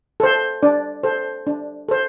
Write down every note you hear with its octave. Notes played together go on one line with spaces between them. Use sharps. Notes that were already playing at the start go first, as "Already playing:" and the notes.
A4 C5
D4 D5
A4 C5
D4
A4 C5